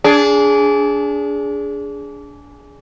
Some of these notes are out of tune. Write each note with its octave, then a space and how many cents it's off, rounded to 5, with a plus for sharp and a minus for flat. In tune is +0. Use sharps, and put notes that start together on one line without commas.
D4 -25 G#4 +0